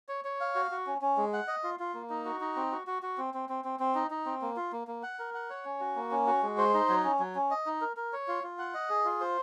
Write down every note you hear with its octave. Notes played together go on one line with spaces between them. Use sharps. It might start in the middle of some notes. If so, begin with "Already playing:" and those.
C#5
C#5
F5
F#4
F#4
C#4
C#4
G#3
F#5
D#5
F4
F4
A#3
D#4
F#4
D#4
C4
F#4
F#4
F#4
C4
C4
C4
C4
C4
D#4
D#4
C4
A#3
F4
A#3
A#3
F#5
A#4
F#5
C#5
C#4
F#4
A#3
C#4
F#4
G#3
C5
D#4
F#3
C#4
F#3
C#4
D#5
D#4
A#4
A#4
C#5
F4
F4
F#5
D#5
G#4
F4
C5